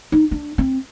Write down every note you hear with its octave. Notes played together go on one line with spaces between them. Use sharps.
D#4
D4
C4